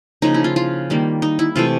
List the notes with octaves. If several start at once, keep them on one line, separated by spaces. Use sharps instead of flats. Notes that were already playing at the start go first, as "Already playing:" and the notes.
C#3 F3 A#3 D#4
E4
F4
F4
D#3 G3 A#3
D#4
E4
C3 E3 A3 F4